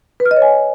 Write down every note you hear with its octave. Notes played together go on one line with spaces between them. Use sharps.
B4
F6
D#5
C#5
G#5